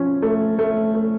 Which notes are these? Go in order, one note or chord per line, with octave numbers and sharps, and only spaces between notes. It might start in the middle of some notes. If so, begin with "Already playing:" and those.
Already playing: F3 C#4
A3
A3
A3